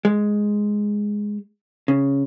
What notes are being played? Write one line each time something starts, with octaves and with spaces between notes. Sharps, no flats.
G#3
C#3